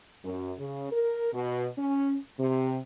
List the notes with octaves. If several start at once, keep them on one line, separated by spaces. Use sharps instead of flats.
F#2
C#3
A#4
B2
C#4
C3